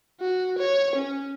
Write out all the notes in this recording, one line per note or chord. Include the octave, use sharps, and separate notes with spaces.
F#4
C#5
C#4